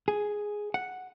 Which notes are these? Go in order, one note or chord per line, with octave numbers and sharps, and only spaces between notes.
G#4
F#5